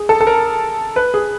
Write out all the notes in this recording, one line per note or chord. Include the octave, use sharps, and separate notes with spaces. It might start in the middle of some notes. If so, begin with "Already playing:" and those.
Already playing: G#4
A4
A4
A#4
B4
G#4